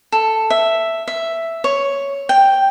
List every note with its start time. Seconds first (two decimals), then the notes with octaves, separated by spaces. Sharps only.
0.12 A4
0.50 E5
1.08 E5
1.64 C#5
2.29 G5